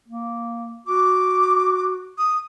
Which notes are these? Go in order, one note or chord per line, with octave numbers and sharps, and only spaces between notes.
A#3
F#4 D6
D#6